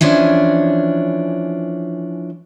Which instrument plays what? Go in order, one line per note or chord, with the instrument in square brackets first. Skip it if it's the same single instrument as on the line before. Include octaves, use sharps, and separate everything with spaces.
[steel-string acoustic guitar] E3 F3 C#4 D4